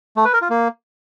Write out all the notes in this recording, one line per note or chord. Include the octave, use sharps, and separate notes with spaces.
A3
B4
A#4
F4
A#3